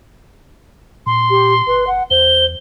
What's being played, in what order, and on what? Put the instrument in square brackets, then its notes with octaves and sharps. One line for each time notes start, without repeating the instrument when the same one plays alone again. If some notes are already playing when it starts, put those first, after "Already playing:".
[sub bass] A#2 [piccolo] C6
[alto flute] G4
[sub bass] G1 [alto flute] B4
[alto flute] F#5
[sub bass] E2 [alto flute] C5 [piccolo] G7